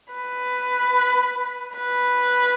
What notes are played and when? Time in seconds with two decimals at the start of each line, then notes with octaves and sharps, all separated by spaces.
0.13 B4
1.76 B4